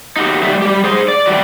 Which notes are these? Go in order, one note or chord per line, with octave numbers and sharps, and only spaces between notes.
D#4 F#4 G4
G3 A3 D#4 F#4 G4 E5
G3 G4
G#4 C5
D5
G3 A3 F#4 D5